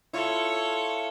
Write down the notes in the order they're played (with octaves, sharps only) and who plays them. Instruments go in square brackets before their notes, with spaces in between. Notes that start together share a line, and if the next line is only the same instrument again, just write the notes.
[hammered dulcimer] E4 F4 [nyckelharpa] A4 C#5